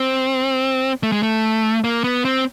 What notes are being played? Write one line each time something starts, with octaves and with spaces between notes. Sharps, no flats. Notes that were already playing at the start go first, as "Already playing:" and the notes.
Already playing: C4
A3
G#3
A3
A#3
B3
C4